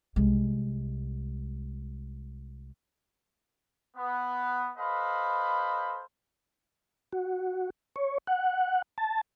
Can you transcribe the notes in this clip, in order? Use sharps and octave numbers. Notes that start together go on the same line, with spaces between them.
C2 G#3
B3
A4 B4 C5 D#5 F5 B5
F#4
C#5
F#5
A5